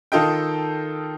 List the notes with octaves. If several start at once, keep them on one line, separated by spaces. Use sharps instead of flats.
D#3 D#4 F4 A4 D#5 G5